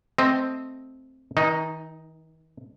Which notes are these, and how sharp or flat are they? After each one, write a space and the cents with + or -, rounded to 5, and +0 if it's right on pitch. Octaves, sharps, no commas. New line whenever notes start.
A3 +0 C4 +0 D#5 -5
D#3 +45 D#4 +0